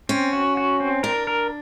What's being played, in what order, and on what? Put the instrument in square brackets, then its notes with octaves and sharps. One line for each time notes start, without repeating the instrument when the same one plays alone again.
[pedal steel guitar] C4 [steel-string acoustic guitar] C#4
[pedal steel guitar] F#4
F#4
C4
[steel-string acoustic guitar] D4 [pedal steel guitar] A#4
[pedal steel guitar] A#4